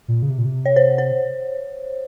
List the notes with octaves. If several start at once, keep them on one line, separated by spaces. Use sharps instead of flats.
A#2
C#3
C3
A#2
C3
C#5
C5
C5